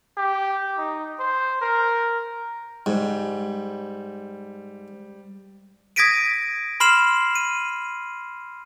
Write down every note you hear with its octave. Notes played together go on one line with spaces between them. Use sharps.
G4
D#4
C5
A#4
G#2 G3
D#6 G#6 A#6 B6 D7 D#7
B5 C6 F6 C7 E7 F#7
D#7